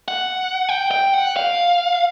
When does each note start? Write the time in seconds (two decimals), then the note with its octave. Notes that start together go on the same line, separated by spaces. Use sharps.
0.08 F#5
0.69 G5
0.91 G5
1.14 F#5
1.36 F5